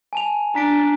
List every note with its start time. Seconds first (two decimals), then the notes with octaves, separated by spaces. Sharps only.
0.13 G#5 A5 F7
0.55 D4 A#5 B6 D7